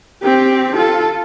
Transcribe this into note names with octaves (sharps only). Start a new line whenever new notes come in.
C4 G4
F4 A4